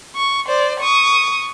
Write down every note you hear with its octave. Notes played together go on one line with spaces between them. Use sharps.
C#6
C5 D5
C#6 D#6